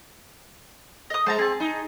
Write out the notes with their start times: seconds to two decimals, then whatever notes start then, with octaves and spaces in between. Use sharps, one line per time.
1.10 D#5 D#6
1.26 G#3 C5 A5 A#5
1.39 C4 G#4 A5
1.60 D#4